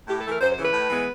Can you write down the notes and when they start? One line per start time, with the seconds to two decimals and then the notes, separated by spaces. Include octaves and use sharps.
0.08 A2 G4
0.18 A4
0.24 E3 A3 A#4
0.41 F#2 C5
0.51 C5
0.58 C#3 E3 B4
0.73 A2
0.90 E3 G#3 B3